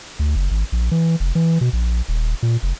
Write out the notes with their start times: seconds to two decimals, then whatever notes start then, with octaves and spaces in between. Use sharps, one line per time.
0.19 D2
0.35 F#1
0.51 G#1
0.72 A#1
0.91 E3
1.20 F1
1.35 E3
1.61 B2
1.73 A#1
2.09 D#1
2.43 A#2
2.63 F1